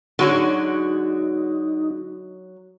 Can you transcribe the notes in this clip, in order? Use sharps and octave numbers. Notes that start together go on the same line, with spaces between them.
D3 F#3 G#3 D#4 F#4 C#5